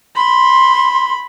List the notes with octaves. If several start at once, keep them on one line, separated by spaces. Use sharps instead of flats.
B5 C6